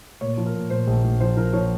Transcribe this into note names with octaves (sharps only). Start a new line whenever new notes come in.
A#2 C#5
F3
A#4
A#2
A#2 C5
A#1
A#1
F3 C5
F3 A#4
F3 C#5